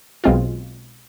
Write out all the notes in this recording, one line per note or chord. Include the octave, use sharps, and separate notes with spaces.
B1 B2 G#3 C4 F4